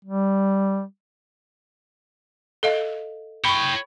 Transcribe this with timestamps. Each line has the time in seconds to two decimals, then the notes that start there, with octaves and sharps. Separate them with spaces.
0.05 G3
2.63 A4 D#5 F5
3.45 C#5 G5 B5 C#6